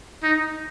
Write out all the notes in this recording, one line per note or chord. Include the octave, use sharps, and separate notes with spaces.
D#4